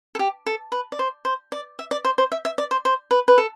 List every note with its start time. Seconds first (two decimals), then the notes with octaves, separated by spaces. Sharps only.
0.15 A4
0.19 G4
0.46 A4
0.72 B4
0.92 D5
0.99 C5
1.25 C5
1.52 D5
1.79 E5
1.91 D5
2.05 C5
2.18 C5
2.32 E5
2.45 E5
2.58 D5
2.71 C5
2.85 C5
3.11 B4
3.28 B4
3.38 A4